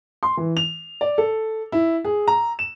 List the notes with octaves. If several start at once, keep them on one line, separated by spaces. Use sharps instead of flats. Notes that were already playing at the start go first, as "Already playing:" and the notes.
C6
E3
F7
D5
A4
E4
G#4
A#5
E7